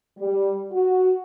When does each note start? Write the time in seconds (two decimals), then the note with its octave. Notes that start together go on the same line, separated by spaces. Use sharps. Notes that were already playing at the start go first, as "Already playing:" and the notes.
0.19 G3
0.72 F#4